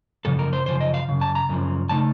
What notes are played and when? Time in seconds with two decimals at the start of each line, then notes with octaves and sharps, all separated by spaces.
0.25 F#2 C#3 F3 A4
0.39 A#4
0.53 C5
0.66 F#2 C#3 F3 C5
0.80 D#5
0.94 F5
1.09 F#2 C#3
1.21 A5
1.35 A#5
1.49 F#2 C#3 F3
1.89 C#3 A3 D#4 A5